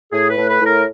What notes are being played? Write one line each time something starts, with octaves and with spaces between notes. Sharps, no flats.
A2 G#4
B4
A2
B4
A2
A#4